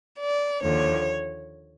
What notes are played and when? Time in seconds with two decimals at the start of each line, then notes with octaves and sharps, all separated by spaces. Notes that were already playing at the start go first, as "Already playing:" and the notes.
0.20 D5
0.62 D#2 D3 F3 C#5